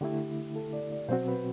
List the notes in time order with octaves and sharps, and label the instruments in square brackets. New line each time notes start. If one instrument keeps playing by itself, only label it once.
[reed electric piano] D3 A3 E4 [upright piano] G4
[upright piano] A4
D5
D5
[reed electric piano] B2 F#3 C4 F#4 [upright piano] C5
[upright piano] B4